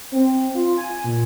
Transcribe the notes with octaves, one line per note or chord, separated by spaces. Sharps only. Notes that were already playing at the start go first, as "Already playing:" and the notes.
C4
F4
G#5
A#2